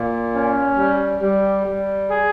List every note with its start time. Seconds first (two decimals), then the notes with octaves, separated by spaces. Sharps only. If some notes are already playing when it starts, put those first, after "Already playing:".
Already playing: A#2
0.33 C#4
0.77 G3
1.21 G3
1.65 G3
2.09 G#4